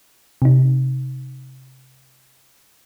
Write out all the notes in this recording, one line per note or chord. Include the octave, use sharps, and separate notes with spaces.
C3 D#4